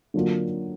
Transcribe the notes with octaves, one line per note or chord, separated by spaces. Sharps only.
D3 F#3 A#3 D4 F4